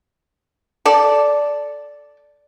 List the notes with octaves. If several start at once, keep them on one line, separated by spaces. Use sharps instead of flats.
A4 D5